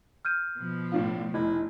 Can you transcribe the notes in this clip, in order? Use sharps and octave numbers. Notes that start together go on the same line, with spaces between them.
F6 G6 D#7
B2 F3
A2 D4 F4
F1 E4